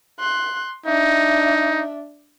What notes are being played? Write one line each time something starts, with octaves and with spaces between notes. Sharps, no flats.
C6 F#6
D4 D#4 E5